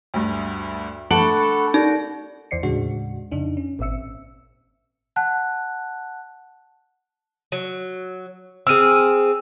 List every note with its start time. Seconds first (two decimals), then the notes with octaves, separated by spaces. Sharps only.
0.14 D2 G2
1.11 A3 D4 A4 F#5 B5 C#6 D7
1.74 D#4 G4 A#4 D5
2.51 E2 E3 C5 D5 C7 C#7
2.63 D#2 A2 C#3 G#3 D4 F#4
3.31 F2 C#3 D4 D#4
3.57 C#4
3.79 G#1 A#2 C4 E5 E6 C#7
5.16 F#5 A5 F#6
7.52 F#3
8.67 C4 G#4 E6 F6 D#7